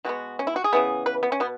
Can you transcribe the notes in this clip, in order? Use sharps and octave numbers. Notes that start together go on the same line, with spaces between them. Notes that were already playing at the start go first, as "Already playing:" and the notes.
B2 G#3 B3 F#4
C#4
E4
F#4
G#4
C#3 E3 B3
B4
B3
C#4
B2 B3